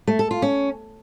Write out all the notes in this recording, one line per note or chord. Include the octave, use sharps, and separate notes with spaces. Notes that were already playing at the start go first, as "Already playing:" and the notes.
A3
A4
F4
C#4